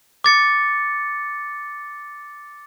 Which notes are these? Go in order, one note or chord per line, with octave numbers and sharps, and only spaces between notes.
D6 A6 C#7